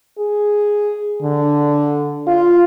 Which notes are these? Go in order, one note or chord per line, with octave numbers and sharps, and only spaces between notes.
G#4
D3
F4